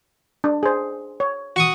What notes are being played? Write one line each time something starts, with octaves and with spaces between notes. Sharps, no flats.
D4
G#4 C5
C#5
F#4 C#6 D#6